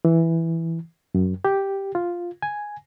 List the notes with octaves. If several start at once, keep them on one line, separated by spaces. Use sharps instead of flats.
E3
F#2
G4
F4
G#5